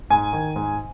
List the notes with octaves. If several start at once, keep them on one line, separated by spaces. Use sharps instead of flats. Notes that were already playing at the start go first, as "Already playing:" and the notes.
G#2 G#5
D#3
G#2